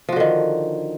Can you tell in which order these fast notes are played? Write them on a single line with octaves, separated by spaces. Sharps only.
F3 F#4 D3 D#3